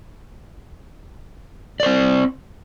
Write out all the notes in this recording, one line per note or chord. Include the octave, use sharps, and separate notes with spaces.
C4 C5 D5